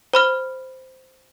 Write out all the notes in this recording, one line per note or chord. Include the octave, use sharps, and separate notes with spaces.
C5 B5 F6